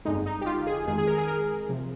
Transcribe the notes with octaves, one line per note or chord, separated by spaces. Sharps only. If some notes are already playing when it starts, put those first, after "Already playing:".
G1 F2 D3 G#3 D#4
D#4
G4
F4
G#4
F2 D#3 G#3 G#4
G#4
A#4
G#4
A#4
C3 F3